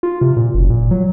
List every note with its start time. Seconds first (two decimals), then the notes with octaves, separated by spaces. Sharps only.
0.03 F4
0.21 C3
0.37 A#2
0.54 F#1
0.70 A#2
0.91 F#3